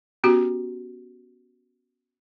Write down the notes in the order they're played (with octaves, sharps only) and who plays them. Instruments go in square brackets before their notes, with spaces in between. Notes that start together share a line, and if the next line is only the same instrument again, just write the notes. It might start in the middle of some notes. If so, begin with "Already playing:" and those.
[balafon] B3 C#4 F#4 G4